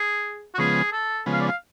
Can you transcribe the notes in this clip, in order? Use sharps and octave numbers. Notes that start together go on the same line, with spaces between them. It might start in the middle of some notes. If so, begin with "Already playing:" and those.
Already playing: G#4
F#4
C#3 F3 G#3 B3 G#4
A4
C#3 F3 G#3 B3
F5
D5
F5